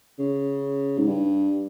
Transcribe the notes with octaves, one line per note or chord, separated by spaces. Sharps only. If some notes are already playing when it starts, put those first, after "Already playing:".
C#3
G#2
G2